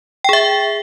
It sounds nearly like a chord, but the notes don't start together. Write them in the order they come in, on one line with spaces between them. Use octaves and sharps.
G5 G#4 E5